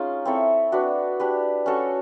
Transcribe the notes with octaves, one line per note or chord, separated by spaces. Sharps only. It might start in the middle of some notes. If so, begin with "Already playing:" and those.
Already playing: G#3 C#4 D#4 F4
C4 E4 A4 C#5
D4 F#4 B4
D4 G4 B4
C#4 F#4 A4 C#5